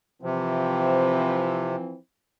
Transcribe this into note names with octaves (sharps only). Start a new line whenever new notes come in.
C3 E3 F3 C4